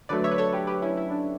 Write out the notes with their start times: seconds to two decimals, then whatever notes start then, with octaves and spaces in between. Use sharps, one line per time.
0.09 D3 F#3 A3 B4 D5
0.24 C#5 E5
0.31 B4
0.38 A4 C#5
0.53 G4 B4
0.67 G4 B4
0.82 C#4 E4
0.97 E4
1.10 D4